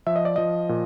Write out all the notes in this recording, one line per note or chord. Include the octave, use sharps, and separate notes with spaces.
F3 E5
D#5
D5
F3 D#5
A#2